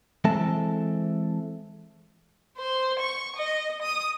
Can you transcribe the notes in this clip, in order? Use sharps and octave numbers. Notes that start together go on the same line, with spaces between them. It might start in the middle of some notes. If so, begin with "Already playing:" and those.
E3 G#3 C4 A4 E5 A5
C5
C#6
D#5
D#6